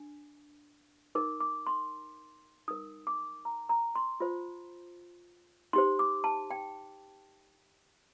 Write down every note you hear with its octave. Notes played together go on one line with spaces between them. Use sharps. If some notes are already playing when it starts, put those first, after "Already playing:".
Already playing: D4
D#4 A#4 D6
D6
C6
D#4 A#4 D#6
D6
A#5
A#5
C6
F4 C5
D#4 G4 C5 C6
D6
A5
G5